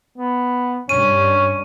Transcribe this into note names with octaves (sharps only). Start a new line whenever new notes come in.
B3
G2 C#4 D#7